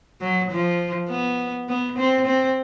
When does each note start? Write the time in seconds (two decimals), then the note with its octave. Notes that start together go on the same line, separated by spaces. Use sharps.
0.21 F#3
0.51 F3
1.09 B3
1.69 B3
1.98 C4
2.27 C4